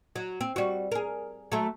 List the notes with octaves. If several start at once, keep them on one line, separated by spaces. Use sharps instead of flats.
F#3
C4
G3 F#4
G#4 A#4
F#3 A3